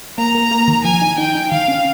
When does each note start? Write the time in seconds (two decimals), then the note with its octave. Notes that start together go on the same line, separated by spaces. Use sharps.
0.18 A#3 A#5
0.35 A#3
0.51 A#3
0.68 D#3
0.84 F3 G#5
1.01 D#4
1.18 D#4 G5
1.35 D#4
1.51 D#3 F5
1.68 C#4